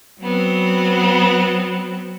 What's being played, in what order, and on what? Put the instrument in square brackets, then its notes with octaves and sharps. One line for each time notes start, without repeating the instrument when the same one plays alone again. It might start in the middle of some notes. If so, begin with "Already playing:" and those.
[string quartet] F#3 B3 C4